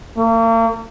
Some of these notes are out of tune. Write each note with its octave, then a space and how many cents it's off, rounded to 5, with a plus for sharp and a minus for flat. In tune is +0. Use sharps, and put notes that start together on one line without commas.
A#3 -40